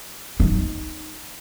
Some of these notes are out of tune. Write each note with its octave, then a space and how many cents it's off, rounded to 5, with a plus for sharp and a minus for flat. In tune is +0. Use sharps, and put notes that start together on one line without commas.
D#4 +0